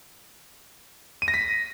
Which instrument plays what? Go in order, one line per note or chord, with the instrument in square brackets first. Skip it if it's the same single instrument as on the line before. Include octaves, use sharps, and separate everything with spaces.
[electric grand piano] D#7
A#6
B6